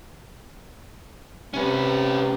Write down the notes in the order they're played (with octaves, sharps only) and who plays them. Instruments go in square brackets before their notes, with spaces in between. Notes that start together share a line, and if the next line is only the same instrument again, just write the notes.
[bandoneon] C3 [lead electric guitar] C#4 B4